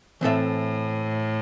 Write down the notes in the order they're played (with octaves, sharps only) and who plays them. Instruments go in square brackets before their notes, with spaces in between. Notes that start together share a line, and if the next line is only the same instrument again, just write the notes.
[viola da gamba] A2 [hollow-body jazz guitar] E3 C4 A4 E5